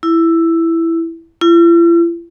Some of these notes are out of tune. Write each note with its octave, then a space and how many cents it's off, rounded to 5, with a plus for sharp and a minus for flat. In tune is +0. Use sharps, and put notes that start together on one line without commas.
E4 +5
E4 +45